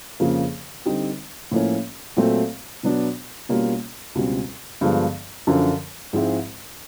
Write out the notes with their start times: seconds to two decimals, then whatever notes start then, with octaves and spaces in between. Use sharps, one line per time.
0.20 F2 C#3 F3 A#3
0.86 D3 G3 C4 D#4 G4
1.52 A2 F3 A#3 C#4
2.17 A#2 F#3 A3 C4
2.83 B2 F#3 B3 D4
3.49 B2 G3 A#3 C#4 F4
4.15 C#2 B2 G3 C4
4.81 G2 D3 F3 G#3 B3
5.47 F#2 D3 F3
6.13 G#2 F3 G#3 C4 E4